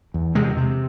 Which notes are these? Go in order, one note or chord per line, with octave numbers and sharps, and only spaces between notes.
E2
C3 G#3
C3